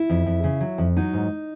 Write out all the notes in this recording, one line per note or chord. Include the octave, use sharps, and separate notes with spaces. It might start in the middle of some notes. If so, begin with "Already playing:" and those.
Already playing: E4
F2
F2
C#3
F#3
F2
F#3 D#4
G#2